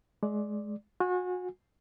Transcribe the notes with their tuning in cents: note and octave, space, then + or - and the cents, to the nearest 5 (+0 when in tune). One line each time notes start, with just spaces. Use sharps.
G#3 +20 D5 +0
F#4 -35 G#5 -25